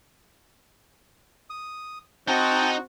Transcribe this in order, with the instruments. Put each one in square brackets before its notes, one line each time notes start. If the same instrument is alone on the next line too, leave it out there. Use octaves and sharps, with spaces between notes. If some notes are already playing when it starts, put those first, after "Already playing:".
[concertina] D#6
[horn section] C4 F#4 [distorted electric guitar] D#4 D#5 [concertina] G5 A5